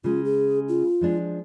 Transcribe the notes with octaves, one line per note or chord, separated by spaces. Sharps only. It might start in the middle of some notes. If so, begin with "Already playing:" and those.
C#3 G#3 F4
G#4
F4
F3 G#3 D4